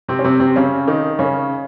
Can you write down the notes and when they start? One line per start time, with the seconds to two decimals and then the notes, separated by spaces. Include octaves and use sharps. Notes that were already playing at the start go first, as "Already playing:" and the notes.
0.08 C3 C4
0.19 C#4
0.24 C3 C4
0.40 C3 C4
0.56 C#3 C#4
0.88 D#3 D#4
1.19 C#3 C#4